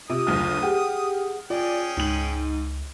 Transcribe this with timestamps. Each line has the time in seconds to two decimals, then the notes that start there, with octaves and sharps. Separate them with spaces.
0.10 C3 F4 D#6
0.27 F#1 D2 F6
0.63 G4 G#4 F#5
1.50 C#4 F4 G#4 D5 G5
1.97 C#2 G#2 F#7